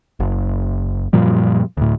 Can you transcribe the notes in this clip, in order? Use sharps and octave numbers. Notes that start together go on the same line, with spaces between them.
F#1
F#2 A#2 F3 G3
D2 A2